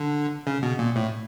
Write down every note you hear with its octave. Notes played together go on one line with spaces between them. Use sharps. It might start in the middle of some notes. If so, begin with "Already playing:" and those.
Already playing: D3
C#3
B2
A#2
A2